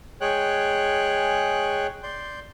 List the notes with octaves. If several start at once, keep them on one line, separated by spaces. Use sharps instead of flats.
G#3 G#4 C#5 G5 F#6
D5 C6 G6